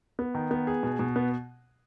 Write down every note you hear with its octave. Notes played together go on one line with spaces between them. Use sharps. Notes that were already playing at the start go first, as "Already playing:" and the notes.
B3
D#3
B3
G#4
B2
B2
B3